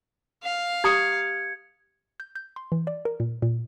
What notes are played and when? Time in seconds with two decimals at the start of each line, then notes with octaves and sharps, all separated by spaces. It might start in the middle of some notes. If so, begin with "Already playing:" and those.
0.43 F5
0.84 G4 A#5 D#6 G#6 C#7
2.20 G6
2.35 G6
2.56 C6
2.72 E3
2.87 D5
3.05 A#4
3.20 A#2
3.42 A#2